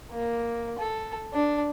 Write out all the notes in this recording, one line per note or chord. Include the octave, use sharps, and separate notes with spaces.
A#3
A4
D4